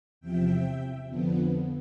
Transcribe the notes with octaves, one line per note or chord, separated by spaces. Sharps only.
E2 C3 F3 E5 G5
F2 D3 F3 B3